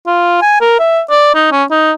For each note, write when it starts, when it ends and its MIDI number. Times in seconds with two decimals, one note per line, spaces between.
0.07 0.40 65
0.42 0.59 80
0.61 0.76 70
0.79 1.01 76
1.10 1.33 74
1.35 1.47 63
1.52 1.64 61
1.71 1.92 63